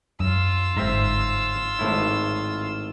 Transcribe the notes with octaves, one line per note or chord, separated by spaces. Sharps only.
F#2 F4 E6
G1 G#2 C4 E5 A#5
G#1 A2 E4